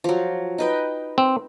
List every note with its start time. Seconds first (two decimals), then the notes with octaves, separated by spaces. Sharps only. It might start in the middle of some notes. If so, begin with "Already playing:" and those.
0.04 F3 F#3
0.58 D#4 B4 G5
1.18 C4